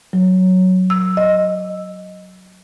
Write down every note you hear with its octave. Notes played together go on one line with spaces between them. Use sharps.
F#3
E6
D#5